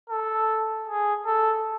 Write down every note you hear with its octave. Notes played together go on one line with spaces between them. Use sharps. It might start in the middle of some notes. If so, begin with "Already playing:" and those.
A4
G#4
A4